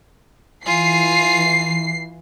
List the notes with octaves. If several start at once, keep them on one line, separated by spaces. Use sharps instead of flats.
E3 F4 G#5 C7